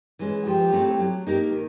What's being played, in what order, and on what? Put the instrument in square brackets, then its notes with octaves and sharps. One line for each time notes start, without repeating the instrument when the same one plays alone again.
[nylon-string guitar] E3 G#3 C#4
[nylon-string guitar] F3 [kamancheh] G4
[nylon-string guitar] A3 C4 E4 A4
F#3
A#3 D#4 G4 A#4
D#3